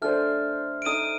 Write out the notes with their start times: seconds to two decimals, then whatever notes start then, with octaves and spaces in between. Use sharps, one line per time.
0.02 A3 D4 A4 C5 F6
0.82 D7
0.85 D#4 A4 D#5 D#6 D#7